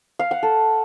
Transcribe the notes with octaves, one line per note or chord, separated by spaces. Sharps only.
F5
F#5
A4